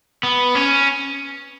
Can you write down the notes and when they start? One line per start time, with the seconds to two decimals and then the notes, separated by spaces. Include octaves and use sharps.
0.23 B3
0.55 C#4